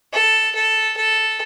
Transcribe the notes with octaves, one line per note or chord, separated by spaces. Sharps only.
A4
A4
A4